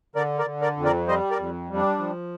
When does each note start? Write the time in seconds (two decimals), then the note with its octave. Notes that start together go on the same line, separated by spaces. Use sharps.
0.15 D3 A#4 D5
0.39 A#4 D5
0.46 D3
0.61 A#4 D5
0.77 F2
0.85 A#4 D5
1.08 G3 C5 D#5
1.31 A#4 D5
1.39 F2
1.70 G3
1.77 D4
1.99 F3